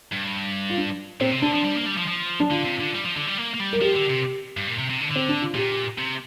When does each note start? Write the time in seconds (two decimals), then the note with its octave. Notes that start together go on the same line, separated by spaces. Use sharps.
0.12 G2
0.70 F4
0.78 D4
1.20 A#2 C4
1.31 C3
1.42 D3 D4
1.53 F3
1.65 G3
1.75 A#3
1.86 G3
1.97 F3
2.07 F3
2.40 D4
2.51 D3 F4
2.65 C3
2.80 D3
2.95 G3
3.05 F3
3.17 D3
3.27 G3
3.38 A#3
3.54 A#3
3.60 G3
3.73 A#4
3.81 F3 G4
3.95 D3
4.10 C3
4.57 G2
4.67 A#2
4.79 C3
4.90 C3
5.01 D3
5.11 D3 C4
5.29 D4
5.41 F4
5.55 A#2 G4
5.98 C3